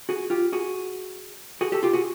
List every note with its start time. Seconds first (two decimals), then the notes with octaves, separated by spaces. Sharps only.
0.09 F#4 G#4
0.30 F4 G4
0.53 F#4 G#4
1.61 F#4 G#4
1.72 G4 A4
1.83 F4 G4
1.93 F#4 G#4